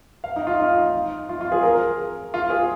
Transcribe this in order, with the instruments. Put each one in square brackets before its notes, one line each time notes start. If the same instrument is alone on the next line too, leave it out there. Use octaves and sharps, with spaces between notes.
[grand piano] F5
D#4
F4
D#4
F4
F4
G#4
A#4
F4
G#4